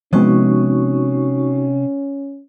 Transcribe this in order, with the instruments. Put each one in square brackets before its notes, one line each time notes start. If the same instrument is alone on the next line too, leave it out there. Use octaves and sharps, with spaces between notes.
[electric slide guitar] C3 [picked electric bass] F3 G#3 B3 [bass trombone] C#4 [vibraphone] D#4 F#4 C#6